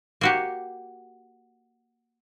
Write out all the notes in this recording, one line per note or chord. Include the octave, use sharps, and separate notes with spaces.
A#3 F#4 G4